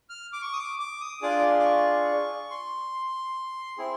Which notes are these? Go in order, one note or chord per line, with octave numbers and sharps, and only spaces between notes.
F6
D6
C#6
D#6
D6
D6
D#6
D4 F4 G#4 D6
D6
C#6
C6
C4 E4 G#4